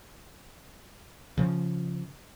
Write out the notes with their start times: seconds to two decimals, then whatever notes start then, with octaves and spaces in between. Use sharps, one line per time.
1.37 C#3 F3